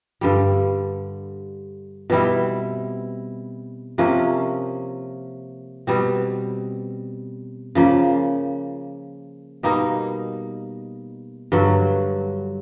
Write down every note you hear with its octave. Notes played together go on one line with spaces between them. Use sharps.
G2 D3 G3
B2 G3 C4 E4
C3 F3 A#3 C#4
B2 G3 C4
C#3 F3 A#3
B2 G3 A#3 D#4
G2 D3 F#3